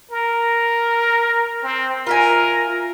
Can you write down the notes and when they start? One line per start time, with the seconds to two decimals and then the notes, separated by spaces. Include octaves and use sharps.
0.11 A#4
1.63 C4
2.07 F4 A#4 E5 G#5